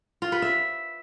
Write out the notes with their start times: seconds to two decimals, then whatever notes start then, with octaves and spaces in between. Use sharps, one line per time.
0.22 F4
0.32 B4
0.42 E5